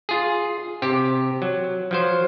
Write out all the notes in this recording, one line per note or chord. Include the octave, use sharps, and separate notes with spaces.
F4 G#4
C3 G4
F#3
F3 F#3 C5